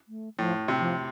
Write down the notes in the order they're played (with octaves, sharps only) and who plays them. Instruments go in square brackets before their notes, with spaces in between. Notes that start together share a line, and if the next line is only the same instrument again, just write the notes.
[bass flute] A3
[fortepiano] A2 [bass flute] F3
[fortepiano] C3
[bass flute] F3